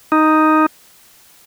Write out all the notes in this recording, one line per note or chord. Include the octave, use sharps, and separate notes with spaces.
D#4